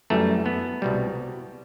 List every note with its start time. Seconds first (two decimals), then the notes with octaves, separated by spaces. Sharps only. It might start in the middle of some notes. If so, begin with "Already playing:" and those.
0.10 F#2 E3 G3 A3
0.46 B3
0.82 C2 B2 G3